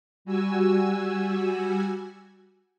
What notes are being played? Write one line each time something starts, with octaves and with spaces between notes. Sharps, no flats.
G3 F#4 G#5 E6